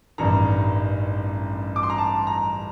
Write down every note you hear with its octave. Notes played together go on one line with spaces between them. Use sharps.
A1 G2 D#3 A#5
D6
C6
A#5
A5
A#5